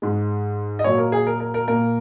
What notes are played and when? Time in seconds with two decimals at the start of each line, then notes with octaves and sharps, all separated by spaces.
0.02 G#2 G#3
0.79 D#5
0.84 A#2 F#3 A#3 C#5
0.98 A#4
1.12 G#4
1.27 A#4
1.40 A#4
1.54 A#4
1.68 A#2 A#3 A#4